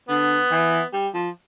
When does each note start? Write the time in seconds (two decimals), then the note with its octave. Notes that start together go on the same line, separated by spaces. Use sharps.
0.09 D3 B3
0.51 E3
0.93 G3
1.14 F3